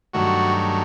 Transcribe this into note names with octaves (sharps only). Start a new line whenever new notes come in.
G2 D#3 F#3 A3 F#4